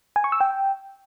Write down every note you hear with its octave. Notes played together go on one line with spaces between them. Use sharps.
G#5
C#6
E6
G5